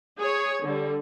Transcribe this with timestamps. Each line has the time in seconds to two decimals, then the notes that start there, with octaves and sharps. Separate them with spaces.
0.19 G#4 C#5
0.63 D3 G3